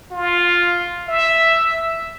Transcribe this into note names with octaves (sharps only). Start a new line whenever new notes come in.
F4
E5